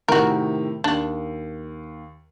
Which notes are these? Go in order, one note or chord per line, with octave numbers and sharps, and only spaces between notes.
A2 C3 D#3 F#4 A#4
D#2 D4